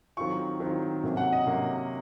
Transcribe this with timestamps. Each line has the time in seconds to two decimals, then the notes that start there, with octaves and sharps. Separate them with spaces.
0.17 D#3 F#3 C4 F4 C#6
0.60 D#3 F#3 C4 F4
1.03 C3 F#3 A#3 C#4
1.17 F#5
1.33 D#5
1.47 C3 F#3 A#3 C#4